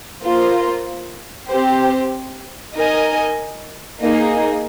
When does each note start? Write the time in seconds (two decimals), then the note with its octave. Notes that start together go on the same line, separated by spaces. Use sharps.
0.24 A#3 F4 C5
1.49 C4 G4 C5
2.74 D#4 A#4 D#5 G#5
4.00 A#3 D#4 G#4